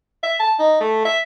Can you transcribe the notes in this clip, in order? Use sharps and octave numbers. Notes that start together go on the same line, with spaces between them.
E5
A5
D#4
A3
E5